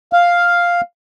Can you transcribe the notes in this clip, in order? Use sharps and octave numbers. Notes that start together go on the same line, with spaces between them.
F5